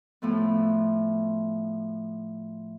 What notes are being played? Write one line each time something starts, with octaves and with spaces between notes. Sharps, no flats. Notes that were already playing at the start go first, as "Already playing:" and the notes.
A2 F3 A3 B3